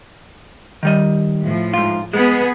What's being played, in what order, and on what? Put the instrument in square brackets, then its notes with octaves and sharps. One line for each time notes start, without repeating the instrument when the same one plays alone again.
[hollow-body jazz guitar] D#3 G3 D#5
[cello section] A2 F3
[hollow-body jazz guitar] G#2 F4
[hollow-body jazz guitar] G#3 [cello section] B3 G#4